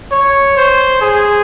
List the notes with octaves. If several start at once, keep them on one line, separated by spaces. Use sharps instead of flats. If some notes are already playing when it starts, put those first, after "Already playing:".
C#5
C5
G#4